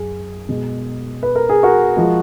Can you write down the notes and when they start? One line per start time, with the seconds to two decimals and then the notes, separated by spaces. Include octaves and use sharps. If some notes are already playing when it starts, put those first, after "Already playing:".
Already playing: F#2 G#4
0.49 B2 G#3
1.23 B4
1.35 A#4
1.49 G#4
1.63 F#4 A#4
1.97 F3 G#3